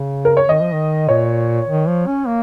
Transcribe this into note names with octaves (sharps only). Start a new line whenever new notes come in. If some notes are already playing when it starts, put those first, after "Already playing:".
Already playing: C#3
A#4
C#5
D#3 D#5
F3
D#3
A#2 C#5
D#3
F3
C#4
A#3